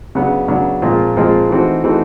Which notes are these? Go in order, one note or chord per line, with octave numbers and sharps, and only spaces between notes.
C#3 F#3 B3 D4
C#3 F#3 B3 D4
A#2 F3 G#3 C4 F4
A#2 F3 G#3 C4 F4
E3 A3 C4 D#4 F#4
E3 A3 C4 D#4 F#4